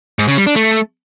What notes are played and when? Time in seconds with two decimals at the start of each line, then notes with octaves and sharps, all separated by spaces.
0.19 G#2
0.28 C#3
0.37 G3
0.47 D4
0.56 A3